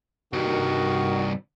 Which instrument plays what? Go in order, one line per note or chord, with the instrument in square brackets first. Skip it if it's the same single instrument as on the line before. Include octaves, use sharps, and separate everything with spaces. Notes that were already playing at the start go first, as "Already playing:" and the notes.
[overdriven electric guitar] C2 G2 [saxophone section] D#3 F#4